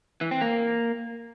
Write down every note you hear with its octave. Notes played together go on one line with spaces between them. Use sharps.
E3
C4
A#3